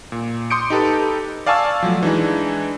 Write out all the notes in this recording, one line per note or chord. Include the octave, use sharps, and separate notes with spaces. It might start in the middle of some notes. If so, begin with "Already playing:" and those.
A#2
C6 D6 D#6 G6 C#7 D7
D#4 G4 A4 B4
D5 F5 G#5 A5 C#6 E6
F3 F#3 A3
E3 G#3 D4 D#4